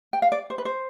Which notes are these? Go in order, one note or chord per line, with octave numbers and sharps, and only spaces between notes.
G5
F5
D5
C5
B4
C5